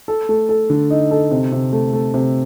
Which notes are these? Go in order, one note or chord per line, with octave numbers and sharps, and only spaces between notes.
A4
A3
A4
D3
D#4
A4
C3
C3
A3
A3
C3